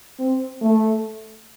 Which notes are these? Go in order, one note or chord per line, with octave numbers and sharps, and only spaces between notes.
C4
A3